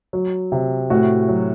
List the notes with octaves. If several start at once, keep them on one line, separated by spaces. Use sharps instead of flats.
F#3
C3
A2 F#4
F#3